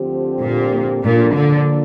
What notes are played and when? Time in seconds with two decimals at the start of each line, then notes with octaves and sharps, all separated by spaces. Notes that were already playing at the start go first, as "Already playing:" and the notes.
Already playing: D2 D3 F3 C4 G4
0.41 A#2
1.03 A#2 F3 A#3 D4 A4
1.34 D3